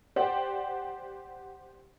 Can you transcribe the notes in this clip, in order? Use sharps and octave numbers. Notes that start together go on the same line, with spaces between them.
G4 C5 D5 F#5